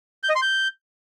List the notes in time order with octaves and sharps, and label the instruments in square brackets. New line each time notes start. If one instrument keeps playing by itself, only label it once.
[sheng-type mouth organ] G6
D#5
C6
G6